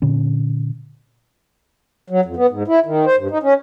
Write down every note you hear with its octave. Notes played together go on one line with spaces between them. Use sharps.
A#2 D3 C#4
F#3
F2
B3
G#2
E4
D#3
C5
G2
D#4
C#4